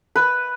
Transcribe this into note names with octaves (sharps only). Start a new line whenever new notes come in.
B4